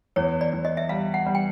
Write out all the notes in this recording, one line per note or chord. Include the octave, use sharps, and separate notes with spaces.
E2 C#5
D5
E2
D#5
E5
G3 F5
F#5
G3
G5